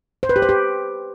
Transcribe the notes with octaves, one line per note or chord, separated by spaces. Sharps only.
C5
B4
G4
C5
G4